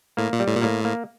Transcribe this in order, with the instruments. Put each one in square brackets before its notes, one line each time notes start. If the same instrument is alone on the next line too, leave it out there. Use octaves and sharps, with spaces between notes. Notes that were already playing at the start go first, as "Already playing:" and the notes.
[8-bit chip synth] A2 [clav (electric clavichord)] A#3
[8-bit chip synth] A#2
[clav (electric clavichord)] G3
[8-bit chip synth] A2
A#2
[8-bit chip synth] A2 [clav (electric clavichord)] A#3
[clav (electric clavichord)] A#3